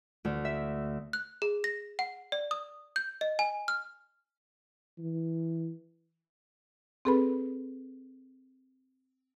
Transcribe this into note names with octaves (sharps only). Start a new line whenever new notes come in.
D2
E5
F#6
G#4
A#6
F#5
D5
D#6
G6
D#5
G#5
F6
E3
C4 G#4 A4 B4 B5